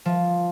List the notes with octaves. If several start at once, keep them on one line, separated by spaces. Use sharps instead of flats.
F3